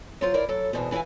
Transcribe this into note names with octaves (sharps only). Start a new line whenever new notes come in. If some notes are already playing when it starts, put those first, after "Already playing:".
F#3 F4 C5
E4 A#4 C5 D5
F#3 A4
E2 G#2 B2 E3 C5
E3 E4 D5 F5 G#5